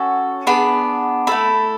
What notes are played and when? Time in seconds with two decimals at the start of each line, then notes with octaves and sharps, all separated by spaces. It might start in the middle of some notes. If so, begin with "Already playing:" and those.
Already playing: C#4 F#4 A4
0.47 B3 D4 G#4 B5
1.27 A3 E4 A4 B5